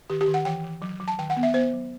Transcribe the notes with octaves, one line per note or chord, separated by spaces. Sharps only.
D#3 G4
G4
D#3
F#5
E3 G5
E3
F#3
F#3
A5
D#3 G5
F#5
B3
E5
B3 C5
F#3